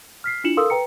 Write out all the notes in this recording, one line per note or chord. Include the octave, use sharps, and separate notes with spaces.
F6 B6 C7
D4 E4 F4 C#7 E7 F#7
A4 A#4 F5 C6 D#6 E6
B4 G5 A#5 C#7